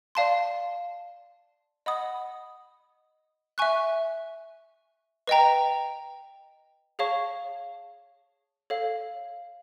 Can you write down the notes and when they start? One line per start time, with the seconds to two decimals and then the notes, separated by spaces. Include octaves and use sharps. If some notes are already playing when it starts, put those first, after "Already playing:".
0.15 D5 F5 A5 C6
1.86 D#5 F#5 B5 D#6
3.58 E5 G#5 C#6 F#6
5.27 B4 D#5 G5 A#5
6.99 G#4 C#5 F5 A5 C#6
8.70 A4 C#5 F5